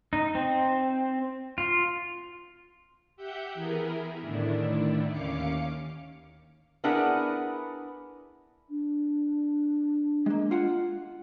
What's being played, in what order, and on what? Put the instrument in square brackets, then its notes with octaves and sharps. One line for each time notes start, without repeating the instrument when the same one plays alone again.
[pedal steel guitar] D#4
C4
F4
[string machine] G4 E5 F#5 G6
E3 B3 E4 G#4 A#4
A2 D3 D#3 D4 E4
D#2 C#4 F5 D6 C#7
[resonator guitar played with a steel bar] B3 D4 E4 G#4 A#4 F#5
[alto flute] D4
[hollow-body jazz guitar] G#3 A#3
F4 F#5